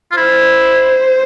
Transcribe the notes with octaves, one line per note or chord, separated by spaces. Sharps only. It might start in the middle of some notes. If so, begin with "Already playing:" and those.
F4
E4 C5